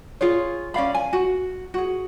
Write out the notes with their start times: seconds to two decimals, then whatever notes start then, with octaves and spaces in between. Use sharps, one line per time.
0.21 F4 G#4 C#5
0.74 C#4 D5 F5 B5
0.94 G#5
1.13 F#4
1.74 F#4 G#4